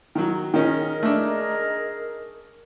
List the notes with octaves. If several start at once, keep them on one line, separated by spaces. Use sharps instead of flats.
D#3 F#3
D#3 C#4 D#4 G#4 A#4
A3 D4